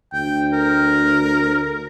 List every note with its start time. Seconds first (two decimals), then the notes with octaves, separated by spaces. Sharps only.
0.13 D2 G5
0.53 A#4